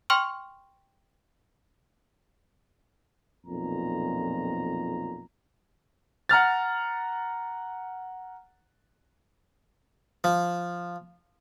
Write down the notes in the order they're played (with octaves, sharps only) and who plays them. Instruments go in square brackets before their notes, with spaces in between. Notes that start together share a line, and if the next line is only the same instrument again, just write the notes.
[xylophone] G5 C6 C#6 F6
[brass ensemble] B1 F2 A#2 A#5
[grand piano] F#5 A#5 F6 A6
[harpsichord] F3